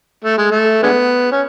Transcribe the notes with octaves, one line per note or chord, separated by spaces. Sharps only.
A3
G#3
A3
D3 G#3 B3
C#4